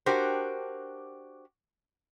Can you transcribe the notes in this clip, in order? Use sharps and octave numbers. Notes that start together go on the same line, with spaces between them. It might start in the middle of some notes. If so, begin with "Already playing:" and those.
D4 F#4 G4 A#4 C5